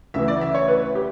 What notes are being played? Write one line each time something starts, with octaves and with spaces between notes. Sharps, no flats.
D2 C#3 E3 E5
D5
E5
C#5
B4
G4